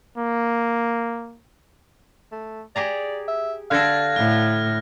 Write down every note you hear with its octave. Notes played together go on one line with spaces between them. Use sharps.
A#3
A3
G4 G#4 D5 A#5
E5
D3 D4 A4 F5 F#6 G#6 A#6
A2 F6